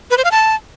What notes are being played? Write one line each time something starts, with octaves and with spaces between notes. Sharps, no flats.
B4
C5
F5
A5